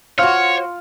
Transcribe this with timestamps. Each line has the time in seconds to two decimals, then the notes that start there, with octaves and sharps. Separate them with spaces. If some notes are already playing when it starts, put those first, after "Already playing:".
0.19 F4 F#4 C5 C#5 F5 F6